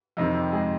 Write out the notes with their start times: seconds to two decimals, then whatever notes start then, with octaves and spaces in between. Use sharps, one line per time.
0.17 F2 C3 D#3 D#4
0.35 G3 G4
0.52 G#3 G#4